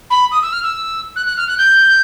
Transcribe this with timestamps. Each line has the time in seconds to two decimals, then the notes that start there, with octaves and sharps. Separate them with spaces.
0.10 B5
0.32 D#6
0.42 E6
0.53 F6
0.63 E6
1.16 F#6
1.26 F#6
1.37 F6
1.48 F#6
1.58 G6